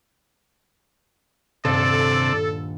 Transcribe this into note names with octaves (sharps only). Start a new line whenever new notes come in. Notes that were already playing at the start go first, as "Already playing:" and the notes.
D#1 G2 C3 A4 D5 E7